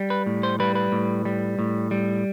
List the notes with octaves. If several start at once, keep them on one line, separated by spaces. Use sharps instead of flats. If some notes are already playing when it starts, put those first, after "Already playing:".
Already playing: G3
B4
A2
C5
G3 B4
B4
A2
G3
A2
G3